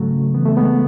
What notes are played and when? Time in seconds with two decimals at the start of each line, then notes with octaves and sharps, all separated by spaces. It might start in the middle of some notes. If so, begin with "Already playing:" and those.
Already playing: G#2 C#3 F#3 A3
0.34 E3 B3
0.45 A3
0.57 G#3 B3